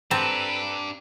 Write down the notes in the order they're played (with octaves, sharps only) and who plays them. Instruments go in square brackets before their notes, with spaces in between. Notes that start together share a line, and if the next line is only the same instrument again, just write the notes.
[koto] C4 [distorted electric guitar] D4 G4 [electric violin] A4 B4 [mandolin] A5 A#5